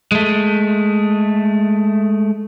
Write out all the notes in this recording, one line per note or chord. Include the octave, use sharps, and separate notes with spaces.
G#3 A3